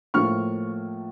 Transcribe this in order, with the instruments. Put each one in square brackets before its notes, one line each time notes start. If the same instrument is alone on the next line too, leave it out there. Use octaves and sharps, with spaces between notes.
[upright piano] A2 F3 A#3 C#6 F6